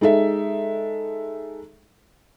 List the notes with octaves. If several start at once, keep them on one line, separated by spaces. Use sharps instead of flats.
G#3 D#4 A4 E5